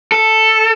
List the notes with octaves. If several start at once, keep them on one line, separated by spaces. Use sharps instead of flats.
A4